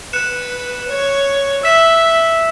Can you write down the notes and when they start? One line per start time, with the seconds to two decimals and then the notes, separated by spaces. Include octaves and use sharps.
0.12 B4 F#6 C#7 E7
0.87 C#5
1.63 E5 E6 B6 E7